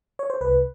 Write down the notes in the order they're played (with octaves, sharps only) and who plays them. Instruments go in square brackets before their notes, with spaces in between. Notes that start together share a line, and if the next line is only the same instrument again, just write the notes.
[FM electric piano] C#5
C5
C2 B4